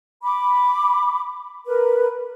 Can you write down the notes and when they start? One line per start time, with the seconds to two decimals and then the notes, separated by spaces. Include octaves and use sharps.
0.23 B5 D6
1.65 A#4 B4